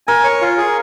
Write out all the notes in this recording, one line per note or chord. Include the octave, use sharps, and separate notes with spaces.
A#4 G#5
C#5
F4
G#4